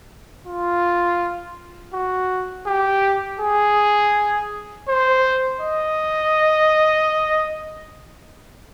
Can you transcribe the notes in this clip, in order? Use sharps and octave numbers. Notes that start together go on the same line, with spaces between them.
F4
F#4
G4
G#4
C5
D#5